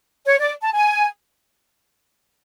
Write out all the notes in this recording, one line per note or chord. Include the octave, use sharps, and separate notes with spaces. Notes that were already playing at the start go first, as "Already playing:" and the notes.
C#5
D5
A5
G#5